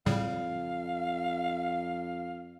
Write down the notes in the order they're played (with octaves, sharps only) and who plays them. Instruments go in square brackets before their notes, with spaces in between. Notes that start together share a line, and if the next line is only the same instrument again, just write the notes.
[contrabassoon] F2 [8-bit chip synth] A2 C#3 G3 [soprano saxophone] F5